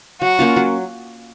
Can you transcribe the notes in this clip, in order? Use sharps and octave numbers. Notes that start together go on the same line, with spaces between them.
F#3 F#4
A#3 C#4 F4
F#3